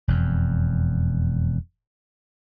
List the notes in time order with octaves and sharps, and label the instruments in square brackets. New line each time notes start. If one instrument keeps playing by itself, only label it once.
[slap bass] E1 F2